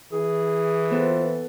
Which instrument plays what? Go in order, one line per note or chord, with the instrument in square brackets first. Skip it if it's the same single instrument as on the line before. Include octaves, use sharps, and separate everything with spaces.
[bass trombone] E3 [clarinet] G#4
[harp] B3 A4 [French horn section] F4 C5